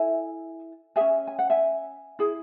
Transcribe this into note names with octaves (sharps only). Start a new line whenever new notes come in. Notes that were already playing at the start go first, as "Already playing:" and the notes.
Already playing: E4 A4 E5 G#5
C#4 G#4 E5 G#5
G#5
F#5
E5 G#5
E4 G#4